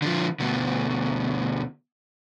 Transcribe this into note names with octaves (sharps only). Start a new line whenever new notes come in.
D3 F3
D2 B2